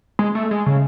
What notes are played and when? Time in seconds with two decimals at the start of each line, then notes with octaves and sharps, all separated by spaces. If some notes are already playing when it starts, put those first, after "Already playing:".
0.19 G#3
0.35 A3
0.51 G#3
0.66 C#3